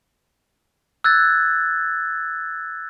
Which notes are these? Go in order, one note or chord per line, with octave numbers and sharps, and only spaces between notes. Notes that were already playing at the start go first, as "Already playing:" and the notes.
E6 F#6 G#6 A6